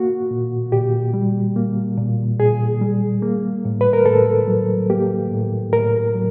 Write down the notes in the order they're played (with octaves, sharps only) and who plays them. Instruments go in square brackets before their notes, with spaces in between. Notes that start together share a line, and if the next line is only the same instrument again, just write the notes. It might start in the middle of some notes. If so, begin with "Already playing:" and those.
Already playing: [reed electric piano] A#3 F#4
A#2
A#2 G4
G3
A#3
A#2
A#2 G#4
G3
A#3
A2
B4
A#4
A2 A4
F#3
A#3 G4
A2
A2 A#4
F#3